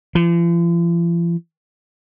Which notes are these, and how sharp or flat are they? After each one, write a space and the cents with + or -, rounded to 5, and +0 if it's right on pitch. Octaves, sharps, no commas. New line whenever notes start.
F3 -45